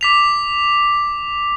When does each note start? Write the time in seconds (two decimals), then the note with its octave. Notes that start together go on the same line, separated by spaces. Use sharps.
0.01 D6 B6 F7